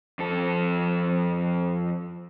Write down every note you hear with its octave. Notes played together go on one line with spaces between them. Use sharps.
F2 A4